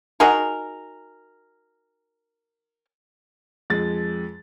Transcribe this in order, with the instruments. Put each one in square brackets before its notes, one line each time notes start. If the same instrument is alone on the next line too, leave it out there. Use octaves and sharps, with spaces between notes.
[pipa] D#4 F#4 G#4 A#4
[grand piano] F2 G#3 A6